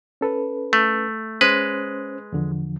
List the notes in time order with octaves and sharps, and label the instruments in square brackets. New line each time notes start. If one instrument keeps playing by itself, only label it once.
[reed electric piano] C#4 A4 B4
[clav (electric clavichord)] A3
[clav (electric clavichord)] G#3 B4 [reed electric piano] C#4 C5
[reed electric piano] E2 D3 F3